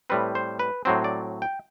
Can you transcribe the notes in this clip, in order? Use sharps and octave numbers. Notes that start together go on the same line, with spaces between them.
A2 G3 C4 B4
C5
B4
A2 F#3 C4 C5
D5
G5